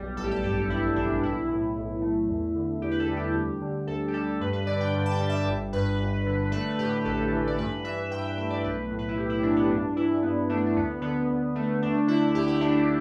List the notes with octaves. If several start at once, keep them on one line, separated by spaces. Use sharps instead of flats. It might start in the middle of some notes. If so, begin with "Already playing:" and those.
Already playing: B1 G3
A1 A4
G4
A4
G2 G4
A1 E4
E3 D4
B1 E4
A2
B1
A3
E2
D3
E2 G4
B4
A4
G3
G4
D2
D3
D2 A4
G4
G3 A4
G2 B4
B4
D3 D5
G5
G2
A5
G5
G3
E5
G1
G2 B4
G1
D3
A3 B4
A2 G4
A1 A4
E3
D5
G2 B4
E3 E5
G2 G5
E5
A3 E5
D5
B1 B4
A2
B4
E4
B1 G4
E4
E3 D4
B3
G2 D4
E3 E4
G2 B3
A3 D4
D4
D2 B3
D3 B3
D2
A3
D2 D4
D3 E4
D2 G4
E4
A3 D4